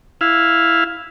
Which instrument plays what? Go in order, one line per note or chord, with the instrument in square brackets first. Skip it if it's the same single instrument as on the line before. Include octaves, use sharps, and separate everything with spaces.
[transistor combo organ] E4 F5